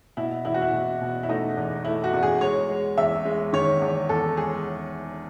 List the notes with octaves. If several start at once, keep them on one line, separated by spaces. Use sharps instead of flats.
B2 E4
E2 E4
F#4
E4
B2
B2
E4
A3 D#4
E2
A3 E4
F#4
E2
G#4
G#3 C#5
G#3
E2 E5
G#3
D#3 C#5
E2
E2 A4
G#3 G#4